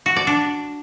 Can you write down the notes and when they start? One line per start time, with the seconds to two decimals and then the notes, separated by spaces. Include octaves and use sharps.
0.06 F#4
0.16 D5
0.27 D4